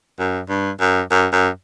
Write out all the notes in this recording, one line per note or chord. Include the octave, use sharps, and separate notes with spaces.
F#2
G2
F#2
F#2
F#2